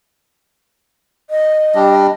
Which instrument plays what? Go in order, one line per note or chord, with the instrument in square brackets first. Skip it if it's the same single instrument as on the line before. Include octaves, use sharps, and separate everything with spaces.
[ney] D#5
[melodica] G3 D4